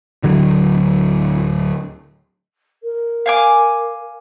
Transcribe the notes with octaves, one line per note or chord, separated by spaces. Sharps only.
D1 D3 F#3
A#4
F5 G#5 D6